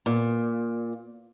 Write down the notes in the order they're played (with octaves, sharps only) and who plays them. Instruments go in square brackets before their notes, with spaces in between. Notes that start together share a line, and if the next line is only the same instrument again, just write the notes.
[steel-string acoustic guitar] A#2